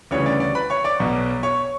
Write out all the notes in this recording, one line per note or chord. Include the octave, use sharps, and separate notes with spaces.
D2 C#3 E3 G3 C#5 C#6
D5
D5
B4 B5
C#5 C#6
D5 D6
B1 B2 F#3
C#5 C#6